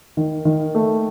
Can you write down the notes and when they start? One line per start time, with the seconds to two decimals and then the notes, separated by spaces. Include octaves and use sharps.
0.17 D#3
0.45 D#3
0.75 A3